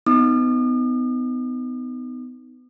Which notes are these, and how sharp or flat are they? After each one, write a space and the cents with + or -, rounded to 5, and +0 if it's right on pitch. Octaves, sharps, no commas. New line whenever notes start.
B3 +30 D#4 +0 D#6 -45